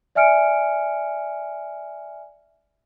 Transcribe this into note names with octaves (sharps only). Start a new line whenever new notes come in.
D5 E5 G#5 F6 C#7 D7